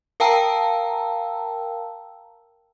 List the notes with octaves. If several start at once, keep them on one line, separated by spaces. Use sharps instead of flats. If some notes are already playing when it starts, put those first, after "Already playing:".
A#4 F5 G5 A5 A#5 E6